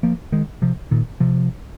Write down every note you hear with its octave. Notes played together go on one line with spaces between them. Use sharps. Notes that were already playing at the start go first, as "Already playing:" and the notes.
F3 A#3
D#3 G#3
C3 F3
A#2 D#3
C3 F3